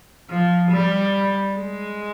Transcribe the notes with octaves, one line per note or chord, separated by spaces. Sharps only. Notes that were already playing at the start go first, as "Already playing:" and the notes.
F3
G3
G#3